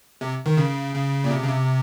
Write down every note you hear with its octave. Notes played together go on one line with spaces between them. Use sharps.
C3
D#3
C#3
C#3
A#2
C3
C#3
C3